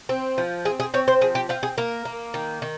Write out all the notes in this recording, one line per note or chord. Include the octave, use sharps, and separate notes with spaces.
C4
F3
C4 G#4
G#4
C4 C#5
C5
F3 G#4
G4
C4 F4
G#4
A#3 A#4
A#3
D#3
D#3